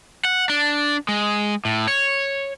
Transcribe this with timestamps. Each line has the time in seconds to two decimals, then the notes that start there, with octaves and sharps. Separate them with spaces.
0.25 F#5
0.50 D4
1.09 G#3
1.65 A2
1.87 C#5